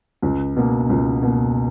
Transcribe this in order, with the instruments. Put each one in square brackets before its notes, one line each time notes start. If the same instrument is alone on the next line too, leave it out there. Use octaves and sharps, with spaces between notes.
[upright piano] C#2
B2 A#3
C#2
B2 A#3